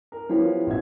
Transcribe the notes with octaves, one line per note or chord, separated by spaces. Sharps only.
A#4
F3 B3 E4 G4 C#5
A1 C#4 E5 G#6